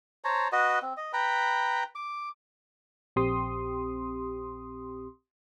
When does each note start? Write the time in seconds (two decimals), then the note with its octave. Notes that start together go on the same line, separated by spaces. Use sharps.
0.24 C5 C#5 A5 A#5
0.52 F#4 B4 D#5
0.82 C4
0.97 D#5
1.13 B4 G5 A#5 B5
1.95 D6
3.16 A#1 C4 G4 C6 D#6